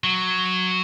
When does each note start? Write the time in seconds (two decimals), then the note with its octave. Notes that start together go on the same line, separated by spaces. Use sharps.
0.04 F#3